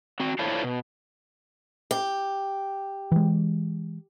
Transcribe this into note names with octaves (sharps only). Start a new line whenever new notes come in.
C4 F#4
D4 E4 F4 A4 C5 C#5
B2
G4
E3 G#3